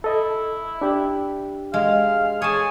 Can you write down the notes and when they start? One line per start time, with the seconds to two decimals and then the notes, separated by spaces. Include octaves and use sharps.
0.04 E4 A4 D#5
0.81 D4 G4
1.74 G#3 F5
2.42 G#4 C#5 A5